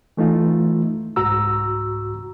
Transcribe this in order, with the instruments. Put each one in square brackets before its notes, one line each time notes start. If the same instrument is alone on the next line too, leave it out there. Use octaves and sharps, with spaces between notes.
[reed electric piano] E3 A3 D#4 F4
C2 G#2 F#4 A#5 E6